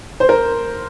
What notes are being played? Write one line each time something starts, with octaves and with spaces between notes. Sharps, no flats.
C5
A#4